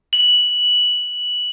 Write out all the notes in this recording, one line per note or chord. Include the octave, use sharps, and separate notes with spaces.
F#7